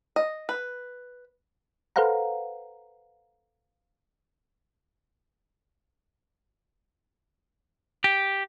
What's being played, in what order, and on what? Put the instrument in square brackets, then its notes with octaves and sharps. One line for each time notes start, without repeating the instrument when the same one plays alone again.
[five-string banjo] D#5
B4
[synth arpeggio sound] A4 B4 C5 F5 F#5 A#5
[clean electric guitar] G4